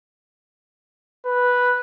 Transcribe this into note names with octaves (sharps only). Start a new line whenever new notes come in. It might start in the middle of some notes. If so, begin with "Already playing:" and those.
B4